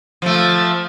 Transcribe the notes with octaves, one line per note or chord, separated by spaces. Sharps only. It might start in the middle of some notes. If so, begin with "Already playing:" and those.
F3 A3